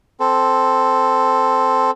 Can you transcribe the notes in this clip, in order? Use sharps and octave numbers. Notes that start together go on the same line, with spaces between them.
C4 A4